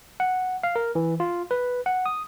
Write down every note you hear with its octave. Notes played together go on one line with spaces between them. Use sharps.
F#5
F5
A#4
E3
F4
B4
F#5
D#6